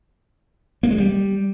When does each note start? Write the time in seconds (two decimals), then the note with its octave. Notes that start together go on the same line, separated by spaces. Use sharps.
0.83 A#3
0.91 G#3
0.98 G3